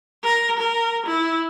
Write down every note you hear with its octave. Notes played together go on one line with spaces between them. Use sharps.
A#4
A#4
E4